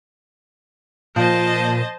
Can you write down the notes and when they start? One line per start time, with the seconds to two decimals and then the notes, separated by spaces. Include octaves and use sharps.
1.16 A#2 F3 C5 D#5 A5